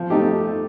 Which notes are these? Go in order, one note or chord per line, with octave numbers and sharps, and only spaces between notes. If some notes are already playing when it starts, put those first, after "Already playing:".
Already playing: F3
A3 D#4 G4